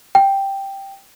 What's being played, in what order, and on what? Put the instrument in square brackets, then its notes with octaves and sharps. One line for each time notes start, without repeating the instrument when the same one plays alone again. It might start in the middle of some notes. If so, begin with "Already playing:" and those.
[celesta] G5